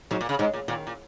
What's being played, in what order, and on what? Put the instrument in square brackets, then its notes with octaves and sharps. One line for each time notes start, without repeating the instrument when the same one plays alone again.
[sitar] G#2 [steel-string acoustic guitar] F#3
[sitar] A#2
C#3
[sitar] G#2 [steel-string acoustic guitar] G#3
[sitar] A#2
[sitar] A#2 [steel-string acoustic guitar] D#3
[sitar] A#2